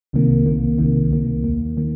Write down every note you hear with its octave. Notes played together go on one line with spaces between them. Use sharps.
C2 C3 D#3 A#3
C2 C3 D#3 A#3
C2 C3 D#3 A#3
C2 C3 D#3 A#3
D#2 D#3 A#3
D#3 A#3